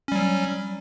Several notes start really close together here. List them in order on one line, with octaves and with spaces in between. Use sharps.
C#4 G3 F#3